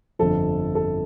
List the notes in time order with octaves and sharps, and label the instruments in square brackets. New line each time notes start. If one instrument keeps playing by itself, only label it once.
[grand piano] G1 F2 D3 F3 A4
A4